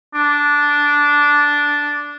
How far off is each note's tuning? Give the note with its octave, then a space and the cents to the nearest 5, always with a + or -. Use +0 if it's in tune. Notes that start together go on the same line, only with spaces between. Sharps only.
D4 -10